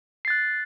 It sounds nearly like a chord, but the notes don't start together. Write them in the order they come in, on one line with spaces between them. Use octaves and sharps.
C7 A6 F#6